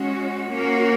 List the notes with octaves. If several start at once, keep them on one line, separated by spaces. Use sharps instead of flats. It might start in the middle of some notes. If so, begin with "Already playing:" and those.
Already playing: G#3 C#4 F#4
A#3 C#4 F#4 A#4